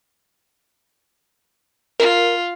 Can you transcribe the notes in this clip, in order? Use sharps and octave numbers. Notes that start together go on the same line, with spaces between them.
F4 A#4